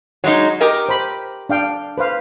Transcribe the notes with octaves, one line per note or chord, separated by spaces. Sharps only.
F#3 G#3 D#4 C#5
G4 A#4 D#5
C5 B5
D4 F5 G5
B4 C5 F5